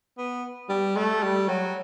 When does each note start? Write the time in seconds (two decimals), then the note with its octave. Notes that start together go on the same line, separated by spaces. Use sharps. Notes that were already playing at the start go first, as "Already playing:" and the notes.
0.18 B3
0.69 G3
0.97 A3
1.23 G3
1.49 F#3